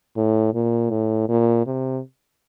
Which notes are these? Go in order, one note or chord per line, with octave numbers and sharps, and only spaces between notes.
A2
A#2
A2
A#2
C3